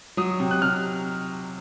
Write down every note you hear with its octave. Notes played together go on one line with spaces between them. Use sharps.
F#3 D#6
C3
F#6
C3 F6